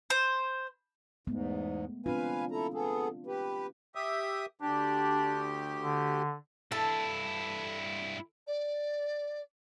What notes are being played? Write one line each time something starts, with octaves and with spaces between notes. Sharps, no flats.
C5
E2 G#2 G#3 A3 B3
C4 D4 F4 B4 F5 G#5
E4 A4 A#5
B3 G#4 A4
G4 B4
G4 E5 D#6
D2 D4 G4
D3
G2 E4 A4
D5